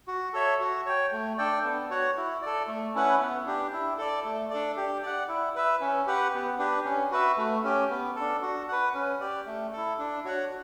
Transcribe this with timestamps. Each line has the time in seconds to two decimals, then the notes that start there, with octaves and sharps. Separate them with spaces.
0.08 F#4
0.33 A4 C#5 E5
0.60 F#4
0.86 C#5 G5
1.12 A3
1.38 D4 A4 D5 G5
1.64 B3
1.90 F#4 C#5 F#5
2.17 E4
2.42 A4 D5
2.68 A3
2.95 C#4 E4 B4 F#5
3.20 B3
3.46 D4 G4
3.73 E4
3.98 A4 D5
4.25 A3
4.50 D4 A4 D5
4.77 G4
5.03 D5 F#5
5.28 E4
5.56 B4 E5
5.81 C#4
6.07 G4 B4 F#5
6.34 B3
6.59 D4 G4 B4
6.85 C#4
7.11 F#4 B4 E5
7.38 A3
7.63 C#4 G4
7.90 B3
8.16 D4 A4
8.42 F#4
8.68 B4 F#5
8.94 C#4
9.20 G4 D5
9.46 A3
9.73 E4 A4
9.99 D4
10.25 F#4 C#5 F#5